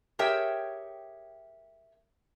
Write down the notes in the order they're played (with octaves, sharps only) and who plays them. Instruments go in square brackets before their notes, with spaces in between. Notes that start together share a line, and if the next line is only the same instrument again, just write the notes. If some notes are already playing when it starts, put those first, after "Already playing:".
[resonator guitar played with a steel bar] G4 G#4 A#4 C#5 E5 G5